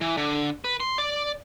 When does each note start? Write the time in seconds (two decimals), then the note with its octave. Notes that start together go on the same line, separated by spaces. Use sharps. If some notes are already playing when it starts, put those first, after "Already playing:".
0.01 E3
0.17 D3
0.64 B4
0.80 C6
0.98 D5